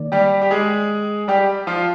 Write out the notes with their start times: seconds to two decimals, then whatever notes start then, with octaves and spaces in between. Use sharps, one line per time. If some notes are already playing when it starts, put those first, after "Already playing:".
Already playing: D#3 A#3 D5
0.12 G3 G4
0.42 G4
0.51 G#3 G#4
1.28 G3 G4
1.67 F3 F4